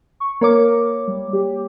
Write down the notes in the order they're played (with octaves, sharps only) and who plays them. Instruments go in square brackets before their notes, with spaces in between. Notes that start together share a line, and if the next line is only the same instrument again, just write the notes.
[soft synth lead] C#6
[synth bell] A#3 C#5 D6 [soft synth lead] A#4
[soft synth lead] G3
G4